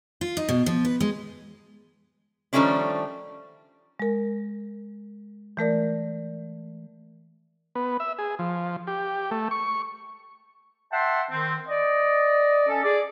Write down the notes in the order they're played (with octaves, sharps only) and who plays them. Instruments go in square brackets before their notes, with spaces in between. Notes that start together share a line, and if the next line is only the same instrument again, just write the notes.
[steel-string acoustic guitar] F4
D#4
B2
F3
B4
G#3
[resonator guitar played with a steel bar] D#3 F3 G3 A3 C#4 D4
[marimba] G#3 A#4
E3 A3 A#4 D5
[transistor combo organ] B3
E5
G#4
F3
G4
A3
C#6
[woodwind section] E5 F#5 G5 A5 C6
D#3 C4
D5 D#5
C#4 A4
G#4 D5